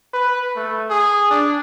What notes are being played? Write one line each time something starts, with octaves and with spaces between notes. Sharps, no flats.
B4
A3
G#4
D4